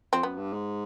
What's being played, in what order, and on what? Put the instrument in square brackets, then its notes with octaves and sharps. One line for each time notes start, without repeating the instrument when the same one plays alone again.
[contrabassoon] F2 [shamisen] C4
[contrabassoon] F#2 [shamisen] B3
[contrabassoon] G2
G#2